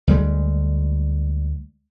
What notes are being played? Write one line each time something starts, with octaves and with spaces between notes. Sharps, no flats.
D2 G3 G#3